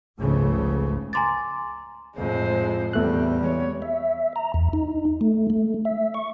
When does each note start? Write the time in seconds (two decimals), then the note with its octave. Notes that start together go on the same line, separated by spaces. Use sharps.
0.19 G1 C#2 G#2 C#3 F3 A3
1.13 G#5 A#5 C6 D6 A6
2.17 F2 A2 G#3 C5
2.93 E2 A2 G3 A3 B3 C4 F#6
3.43 E3 G#3 C#5
3.82 E5
4.36 A#5
4.54 E2
4.73 D#4
5.21 A3
5.50 A3
5.85 E5
6.14 C#6